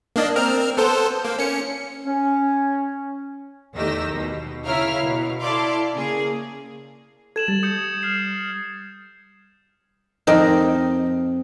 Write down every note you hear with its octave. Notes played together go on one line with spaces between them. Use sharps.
A#3 D4 D#5
C4 A#4 F6
B3 A4 C5
A#3
C#4 C#7
C#4
E2 D#3 A3 G4 E6 A#6
D#2 B2
C#3 E4 A#4 C#5 F5 F6
B2
E4 A4 D5 F5 C6 D6
C#3 A#3 G#4
A4 G#6 E7 F#7
G3 A6
D#6 G6 C#7
F6 C7
F2 C4 D#4 A#4 D#5 C6